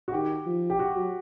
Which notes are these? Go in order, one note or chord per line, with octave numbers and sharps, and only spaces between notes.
F#4
D#3 G4
F3
G4
F#4
F#3